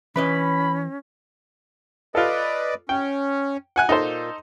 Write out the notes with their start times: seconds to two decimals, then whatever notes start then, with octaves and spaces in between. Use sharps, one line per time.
0.16 E3 C#4 B4 D#5 B5
2.15 F4 A4 B4 D5 D#5
2.89 C#4 G5
3.76 F#5 G#5 F#6
3.89 A#2 D#4 A4 C5